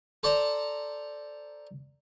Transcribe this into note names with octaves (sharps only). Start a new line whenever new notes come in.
A4 C5 D5 A5 A#5